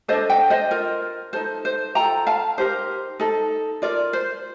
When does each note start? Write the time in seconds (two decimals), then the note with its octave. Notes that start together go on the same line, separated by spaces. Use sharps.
0.08 A4 C5 D#5
0.12 D4
0.30 D#5 G5
0.50 C5 D#5
0.71 F4 A#4
1.33 D#4 A4 C5
1.65 C5
1.95 F4 A4 G5 A#5
2.27 F5 A5
2.58 D#4 G4 A#4 C5
3.20 D#4 A4
3.82 F4 A#4 D5
4.13 C5